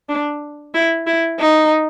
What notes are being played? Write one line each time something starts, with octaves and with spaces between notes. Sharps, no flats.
D4
E4
E4
D#4